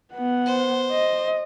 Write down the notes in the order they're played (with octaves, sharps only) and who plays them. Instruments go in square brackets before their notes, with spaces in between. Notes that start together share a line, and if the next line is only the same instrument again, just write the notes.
[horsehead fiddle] B3 F#5
[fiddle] C5
[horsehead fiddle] D#5